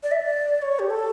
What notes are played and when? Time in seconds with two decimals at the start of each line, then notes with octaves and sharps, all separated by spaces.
0.03 D5
0.11 E5
0.20 D5
0.62 C#5
0.79 G4
0.90 A4